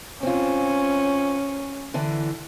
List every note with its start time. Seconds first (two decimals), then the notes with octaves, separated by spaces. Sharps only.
0.23 C4 C#4 F4
1.94 D3 E3